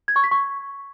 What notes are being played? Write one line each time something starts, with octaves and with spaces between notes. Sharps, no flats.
G#6
C#6
B6
C#6